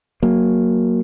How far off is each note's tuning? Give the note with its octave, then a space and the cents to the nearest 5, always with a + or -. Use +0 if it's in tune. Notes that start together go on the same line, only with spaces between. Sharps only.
F#3 +0 A#3 +0